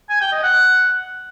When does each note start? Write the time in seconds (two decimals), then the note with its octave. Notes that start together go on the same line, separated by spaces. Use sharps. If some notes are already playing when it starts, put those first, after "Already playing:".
0.10 G#5
0.21 G5
0.32 D#5
0.43 F#5